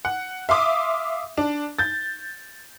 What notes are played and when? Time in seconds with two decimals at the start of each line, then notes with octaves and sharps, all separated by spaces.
0.05 F#5
0.49 E5 F5 C6 D6 D#6
1.38 D4
1.79 G6 A6